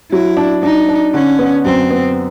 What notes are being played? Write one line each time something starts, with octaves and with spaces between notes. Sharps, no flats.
F#3 E4
D4
D4 D#4
D4
D3 C#4
B3
F#2 C4
B3